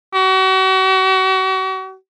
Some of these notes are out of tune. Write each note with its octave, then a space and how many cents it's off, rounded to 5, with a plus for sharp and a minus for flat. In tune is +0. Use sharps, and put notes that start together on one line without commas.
F#4 +40